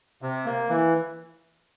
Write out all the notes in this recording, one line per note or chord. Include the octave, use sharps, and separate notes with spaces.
C3
A#3
E3